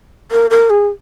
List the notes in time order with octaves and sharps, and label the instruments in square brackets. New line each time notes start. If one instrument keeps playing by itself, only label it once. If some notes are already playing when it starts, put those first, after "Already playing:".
[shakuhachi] A#4
A#4
G#4